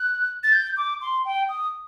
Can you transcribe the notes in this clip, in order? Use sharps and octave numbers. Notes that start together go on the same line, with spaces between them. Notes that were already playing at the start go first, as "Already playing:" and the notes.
Already playing: F#6
A6
G6
D6
C6
G5
D#6